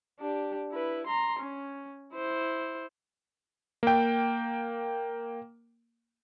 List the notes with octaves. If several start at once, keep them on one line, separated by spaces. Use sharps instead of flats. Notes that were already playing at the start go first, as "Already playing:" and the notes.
D4 G4
E4 B4
A#5 C6
C#4
E4 C5
A#3 G5